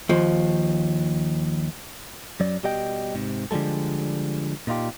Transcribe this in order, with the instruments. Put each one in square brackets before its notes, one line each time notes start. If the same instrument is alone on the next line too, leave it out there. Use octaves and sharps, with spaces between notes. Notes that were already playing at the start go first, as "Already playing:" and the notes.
[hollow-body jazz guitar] D#2 F3
[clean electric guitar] F#2 F#3 D5
B2 G3 G4 D#5 G5
G#2 C3
D3 F3 G3 G#3 A4
A#2 D#4 F4 G4